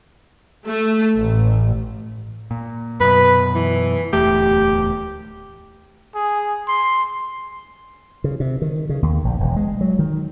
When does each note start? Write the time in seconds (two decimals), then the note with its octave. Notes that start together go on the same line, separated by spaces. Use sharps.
0.65 A3
1.15 A1
2.51 A#2
3.00 F#2 B2 B4
3.55 E3
4.13 D1 E2 A3 G4
6.15 G#4
6.68 C6
8.24 C#3
8.40 C3
8.62 D#3
8.89 C#3
9.03 D#2
9.25 A#1
9.40 E1
9.56 G#3
9.81 F#3
9.99 D#3